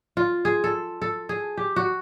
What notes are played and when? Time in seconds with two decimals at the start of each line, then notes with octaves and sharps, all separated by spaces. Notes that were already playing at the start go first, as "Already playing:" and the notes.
0.17 F4
0.45 G#4
0.64 A4
1.02 A4
1.29 G#4
1.57 G4
1.76 F#4